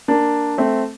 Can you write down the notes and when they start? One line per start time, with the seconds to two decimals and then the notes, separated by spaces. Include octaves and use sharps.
0.08 A#3 D4
0.58 A3 C4